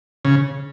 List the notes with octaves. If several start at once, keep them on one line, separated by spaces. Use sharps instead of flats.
C#3